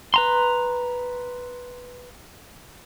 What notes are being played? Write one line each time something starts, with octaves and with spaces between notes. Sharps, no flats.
B4 A#5 C6